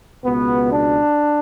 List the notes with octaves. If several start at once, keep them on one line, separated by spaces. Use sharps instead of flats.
C#2 B2 B3
D4